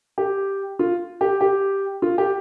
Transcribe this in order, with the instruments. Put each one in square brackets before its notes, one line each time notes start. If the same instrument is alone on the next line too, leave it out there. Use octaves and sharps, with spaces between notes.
[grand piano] G4
F4
G4
G4
F4
G4